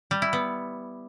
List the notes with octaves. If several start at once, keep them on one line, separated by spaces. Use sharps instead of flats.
G3
E4
B3